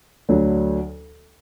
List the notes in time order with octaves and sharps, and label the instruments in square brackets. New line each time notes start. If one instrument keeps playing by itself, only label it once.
[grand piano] D2 D3 F#3